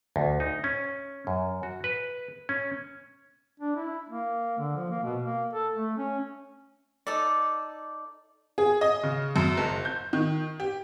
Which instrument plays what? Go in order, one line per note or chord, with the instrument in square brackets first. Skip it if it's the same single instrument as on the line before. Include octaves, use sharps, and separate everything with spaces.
[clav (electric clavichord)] D2
D#4
C#4
F#2
F#4
B4
C#4
[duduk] D4
E4
A#3
D3
F3
A#3
B2
A#3
A4
A3
C#4
[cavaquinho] D#4 A4 D5
[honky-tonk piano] G#4
D#5
C#3
F#2
F#1
G6
D#3
G4